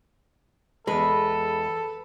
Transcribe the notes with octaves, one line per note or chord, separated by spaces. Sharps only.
E2 G#3 A4 B4